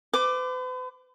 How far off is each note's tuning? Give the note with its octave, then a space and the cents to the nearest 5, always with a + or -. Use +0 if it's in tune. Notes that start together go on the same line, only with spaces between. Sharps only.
B4 +45 D6 +5